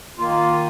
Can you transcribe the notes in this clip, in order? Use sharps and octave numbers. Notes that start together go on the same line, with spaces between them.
D#3 A#3 F4